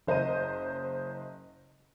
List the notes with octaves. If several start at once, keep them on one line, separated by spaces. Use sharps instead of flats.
F#1 C5 D#5 A#5 D#7